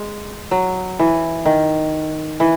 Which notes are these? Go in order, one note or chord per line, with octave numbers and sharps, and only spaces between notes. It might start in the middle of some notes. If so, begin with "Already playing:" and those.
Already playing: G#3
F#3
E3
D#3
E3